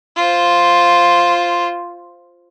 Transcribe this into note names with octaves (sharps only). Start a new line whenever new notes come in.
F4 C5